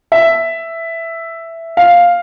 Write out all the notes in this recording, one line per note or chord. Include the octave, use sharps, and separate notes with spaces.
E5
F5